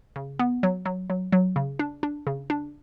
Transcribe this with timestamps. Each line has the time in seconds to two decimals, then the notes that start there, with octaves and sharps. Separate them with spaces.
0.16 C#3
0.39 B3
0.63 F#3
0.85 F#3
1.10 F#3
1.32 F#3
1.56 C#3
1.79 D4
2.03 D4
2.27 C#3
2.50 D4